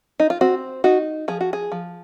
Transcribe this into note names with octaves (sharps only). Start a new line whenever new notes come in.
D#4
F4
C4 F#4
D#4 F#4
F3 G#4
F#4
G#4
F3